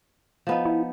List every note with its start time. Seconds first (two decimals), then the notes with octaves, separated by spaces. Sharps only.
0.47 F3 B3 D#4
0.65 E4